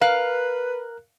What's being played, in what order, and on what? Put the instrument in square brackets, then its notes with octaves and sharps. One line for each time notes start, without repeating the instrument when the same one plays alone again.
[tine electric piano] A#4 F#6 [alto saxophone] B4 [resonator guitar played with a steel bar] F5